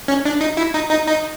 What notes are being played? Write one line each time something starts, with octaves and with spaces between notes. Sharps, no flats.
C#4
D4
D#4
E4
D#4
D#4
D#4